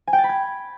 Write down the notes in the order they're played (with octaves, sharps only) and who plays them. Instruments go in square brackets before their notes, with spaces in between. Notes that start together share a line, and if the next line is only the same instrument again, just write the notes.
[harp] G#5
G5
A6
B5
G#6